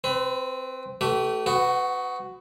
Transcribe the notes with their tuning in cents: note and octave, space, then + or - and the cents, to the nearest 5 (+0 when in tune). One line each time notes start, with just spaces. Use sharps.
C4 +0 B4 +35
A3 +0 G4 -40 B4 +0
B3 +30 F#4 +0